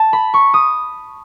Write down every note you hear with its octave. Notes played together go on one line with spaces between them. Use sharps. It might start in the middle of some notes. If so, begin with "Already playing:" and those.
Already playing: A5
B5
C#6
D#6